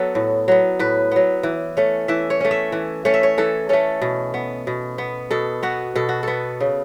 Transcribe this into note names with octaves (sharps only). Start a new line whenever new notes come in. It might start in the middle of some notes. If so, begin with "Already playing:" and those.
Already playing: F#3 B3 F#4 A4
A2
F#3 B3
A2 B4
F#3 B3
E3
A3 C#4
E3 E5
C#5
A3 C#4
E5
E3
A3 C#4 C#5
E5
C#5
E3 A4
A3 C#4 A4
B2
B3
B2
B3
B2 A4
B3 F#4
B2 A4
F#4
B3 A4
C#3